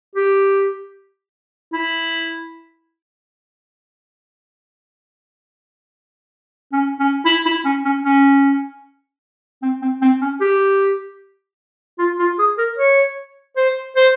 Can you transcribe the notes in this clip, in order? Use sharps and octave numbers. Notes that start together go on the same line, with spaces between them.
G4
E4
C#4
C#4
E4
E4
C#4
C#4
C#4
C4
C4
C4
C#4
G4
F4
F4
G#4
A#4
C#5
C5
C5